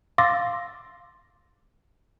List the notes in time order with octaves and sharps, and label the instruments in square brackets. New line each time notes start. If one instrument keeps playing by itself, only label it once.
[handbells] F5 C6 D6 E6 A6 A#6